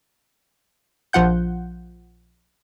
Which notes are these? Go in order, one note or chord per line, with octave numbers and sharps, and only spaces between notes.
A#1 F3 F4 F#5 G6